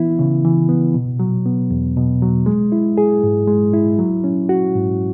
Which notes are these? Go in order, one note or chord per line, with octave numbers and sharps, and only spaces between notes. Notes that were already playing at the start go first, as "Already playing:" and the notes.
Already playing: E3 B3 E4
C#3
E3
B3
B2
F#3
B3
E2
B2
F#3
G#3
E4
G#4
G#2
G#3
E4
F#3
C#4
F#4
G#2